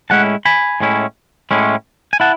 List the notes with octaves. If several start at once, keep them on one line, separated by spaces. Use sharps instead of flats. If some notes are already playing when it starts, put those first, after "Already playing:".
A2 G#3 C#4 E4 F#5 A5
G#5 B5
A2 G#3 C#4 E4
A2 G#3 C#4 E4
G#5
E4 F#5 A5